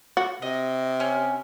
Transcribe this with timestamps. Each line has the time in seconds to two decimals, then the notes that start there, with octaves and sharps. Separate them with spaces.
0.17 F#4
0.42 C3 D#5
1.00 C#4